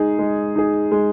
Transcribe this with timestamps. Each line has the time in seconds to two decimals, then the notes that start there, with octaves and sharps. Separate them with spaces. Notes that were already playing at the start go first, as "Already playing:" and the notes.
Already playing: G#3 D#4 G#4
0.19 G#3
0.55 D#4 G#4
0.92 G#3